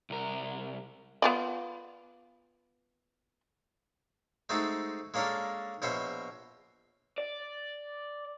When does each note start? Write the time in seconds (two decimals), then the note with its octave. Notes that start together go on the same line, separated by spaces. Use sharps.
0.10 C2 A#4
1.22 B3 F4 D5
4.49 G#3 A3 C4 D#4 F#4 A4
5.14 G#3 A#3 C#4 D4 A4 A#4
5.82 A#1 B2 C#4 C5 E5
7.18 D5